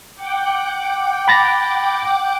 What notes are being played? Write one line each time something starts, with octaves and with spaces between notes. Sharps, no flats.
F#5 G5 D6
B5 A6 A#6